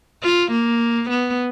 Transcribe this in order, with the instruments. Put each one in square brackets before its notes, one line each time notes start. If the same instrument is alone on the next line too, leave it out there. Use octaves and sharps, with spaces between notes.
[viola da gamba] F4
A#3
B3